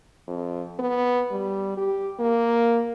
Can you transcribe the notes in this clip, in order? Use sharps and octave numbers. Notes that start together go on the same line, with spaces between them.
F2
B3
G3
G4
A#3